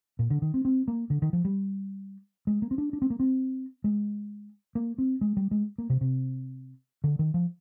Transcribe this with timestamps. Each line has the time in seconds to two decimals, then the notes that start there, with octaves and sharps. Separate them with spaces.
0.19 A#2
0.30 D3
0.42 D#3
0.54 C4
0.65 C4
0.88 A#3
1.10 D3
1.22 D#3
1.33 F3
1.45 G3
2.47 G#3
2.62 A#3
2.71 C4
2.78 D4
2.93 D4
3.02 C4
3.10 A#3
3.20 C4
3.84 G#3
4.75 A#3
4.98 C4
5.21 G#3
5.37 G3
5.51 G#3
5.78 A#3
5.90 C3
6.01 C3
7.04 D3
7.19 D#3
7.34 F3